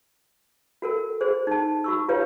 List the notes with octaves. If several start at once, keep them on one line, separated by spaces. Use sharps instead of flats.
F#4 A4 A#4
F#4 G#4 C5
D#4 A5
F#4 C#6 E6
F4 G4 B4 C#5 F5